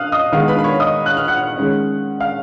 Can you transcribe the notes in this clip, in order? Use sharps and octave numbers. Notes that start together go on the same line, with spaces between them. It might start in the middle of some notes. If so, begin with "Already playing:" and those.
Already playing: F5 D#6 F6 F#6
D#5 D#6
D#3 G#3 B3 D#4 F5 F6
B4 B5
B5
C#5 C#6
D#5 D#6
F#6
F6
F#5 F#6
D#3 G#3 C#4
F5 F6